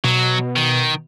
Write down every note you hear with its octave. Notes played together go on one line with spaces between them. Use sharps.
B2 F#3
D#3